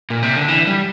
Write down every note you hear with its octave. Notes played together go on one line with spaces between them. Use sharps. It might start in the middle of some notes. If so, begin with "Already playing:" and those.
A#2
C3
D3
E3
G3